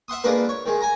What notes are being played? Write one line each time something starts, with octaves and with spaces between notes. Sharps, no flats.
E5 F#5 C6 D#6
D3 G#3 A#3 F4 A#4 B4
C#5
D#3 G#3
G#5 A#5